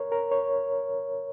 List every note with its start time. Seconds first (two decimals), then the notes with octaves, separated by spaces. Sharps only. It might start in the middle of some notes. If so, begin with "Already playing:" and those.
Already playing: A#4 C#5
0.12 A#4
0.32 C#5